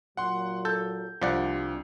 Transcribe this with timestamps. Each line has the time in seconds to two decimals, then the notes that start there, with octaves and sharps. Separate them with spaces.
0.17 A#2 F#3 F#5 C6
0.65 A4 G6
1.22 C2 F3 G3 D4 D5 F#5